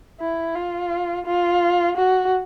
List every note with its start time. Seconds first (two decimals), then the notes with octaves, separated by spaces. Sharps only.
0.20 E4
0.55 F4
1.26 F4
1.97 F#4